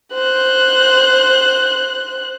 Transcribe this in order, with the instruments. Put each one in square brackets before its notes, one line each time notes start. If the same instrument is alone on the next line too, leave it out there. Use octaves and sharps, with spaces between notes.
[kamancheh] C5 F#6